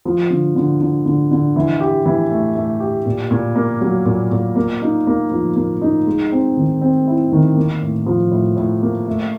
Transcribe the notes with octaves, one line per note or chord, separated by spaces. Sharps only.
F3
D3
D3
D3
D3
D3
E3
G4
E3
A3
A3
G4
A#2
A#2
A#3
F#3
A#2
A#2
A#3
D#4
A#3
F3
A#3
D#4
G#3
C4
D#3
C4
E4
D#3
A#3
A2
F3
A2
A2
A#3
A3